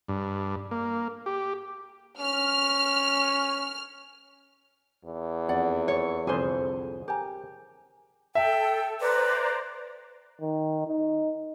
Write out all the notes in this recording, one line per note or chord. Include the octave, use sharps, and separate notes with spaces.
G2
A#3
G4
C#4 F6
E2
F2 D5 F#5
C#5 D5
C2 F2 D3 G#4 C5
G4 A#4 G#5
A4 E5 G5
B4 C5 D5 A#5
D#3
D#4